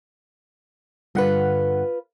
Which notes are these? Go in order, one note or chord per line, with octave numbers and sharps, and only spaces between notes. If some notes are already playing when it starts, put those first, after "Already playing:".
G2 D3 F4 B4 F#5